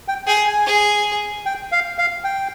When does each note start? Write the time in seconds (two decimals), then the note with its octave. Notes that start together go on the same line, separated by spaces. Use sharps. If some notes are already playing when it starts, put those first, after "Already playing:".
0.08 G5
0.27 G#4 G5
0.47 G#5
0.67 G#4
1.46 G5
1.72 F5
1.98 F5
2.24 G5